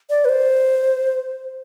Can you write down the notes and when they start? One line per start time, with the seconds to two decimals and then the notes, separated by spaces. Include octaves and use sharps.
0.10 D5
0.25 B4
0.29 C5